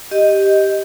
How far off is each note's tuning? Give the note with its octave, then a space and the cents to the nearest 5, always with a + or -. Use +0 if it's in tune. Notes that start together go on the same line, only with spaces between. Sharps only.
G4 +0 D#5 +0